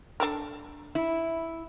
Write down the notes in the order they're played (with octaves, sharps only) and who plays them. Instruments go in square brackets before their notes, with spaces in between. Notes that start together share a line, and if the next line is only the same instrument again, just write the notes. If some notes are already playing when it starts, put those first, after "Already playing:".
[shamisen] D4 A4 A#4
[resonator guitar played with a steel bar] E4